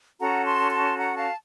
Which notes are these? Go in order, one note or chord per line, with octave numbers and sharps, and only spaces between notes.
C#4 F#4 A4 F#5 A#5
A5 C6
A5 C6
F#5 A#5
F5 A5